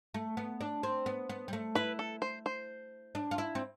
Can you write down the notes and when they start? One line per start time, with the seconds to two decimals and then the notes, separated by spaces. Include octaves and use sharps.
0.14 A3
0.37 B3
0.61 D4
0.83 C4
1.06 B3
1.29 B3
1.48 G3
1.53 A3
1.75 E4 B4
1.99 A4
2.22 C5
2.46 C5
3.15 D4
3.31 F4
3.38 E4
3.55 C4